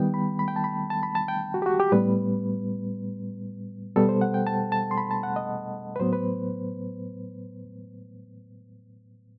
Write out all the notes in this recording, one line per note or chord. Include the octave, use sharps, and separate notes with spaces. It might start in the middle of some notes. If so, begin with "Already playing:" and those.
Already playing: D#3 G3 B3 G5
B5
B5
G5
A5
B5
A5
B5
A5
G5
F#4
G4
F#4
G4
A2 G3 B3 B4
B2 G3 B3 A4
C5
F#5
G5
A5
A5
C6
B5
A5
F#5
D#5
B4
A2 F#3 B3 C5
B4